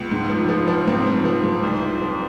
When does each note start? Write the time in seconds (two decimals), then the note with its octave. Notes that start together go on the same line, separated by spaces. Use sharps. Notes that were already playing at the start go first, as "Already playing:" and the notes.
Already playing: C#2 B3
0.11 G#2
0.29 F3
0.49 F3
0.68 F3
0.87 G#2 C4
1.06 F3
1.25 F3
1.43 G#2
1.62 C2
1.82 F3
2.02 F3